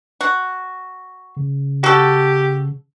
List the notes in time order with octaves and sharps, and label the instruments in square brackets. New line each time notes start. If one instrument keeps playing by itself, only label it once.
[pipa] F#4
[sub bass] C#3
[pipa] F#4 A4 [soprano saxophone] G4